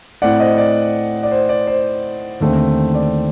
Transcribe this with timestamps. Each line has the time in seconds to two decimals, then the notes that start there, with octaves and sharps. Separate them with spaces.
0.22 A2 A3 C4 D5 F#5
0.40 C5 D#5
0.58 D5
1.23 D5
1.31 C5
1.49 D5
1.67 C5
2.40 D#2 D3 A3 C4
2.94 D5